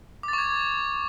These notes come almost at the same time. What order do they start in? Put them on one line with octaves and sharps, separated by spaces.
D6 A6 C#6 G#6